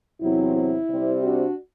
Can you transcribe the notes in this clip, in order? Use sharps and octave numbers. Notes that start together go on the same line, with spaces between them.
E2 C3 F#3 C4 E4
E4
C3 G3 C4
D4 F#4